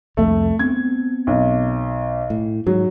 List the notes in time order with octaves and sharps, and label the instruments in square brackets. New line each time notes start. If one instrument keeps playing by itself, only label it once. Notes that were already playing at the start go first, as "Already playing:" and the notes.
[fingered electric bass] C2 F2 [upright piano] A3
[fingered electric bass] B3 C4 [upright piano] G#6
[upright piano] B1
[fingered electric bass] A2
[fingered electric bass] G#2 [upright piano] F#3